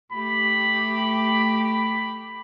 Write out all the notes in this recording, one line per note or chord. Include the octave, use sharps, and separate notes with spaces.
A3 G4 B5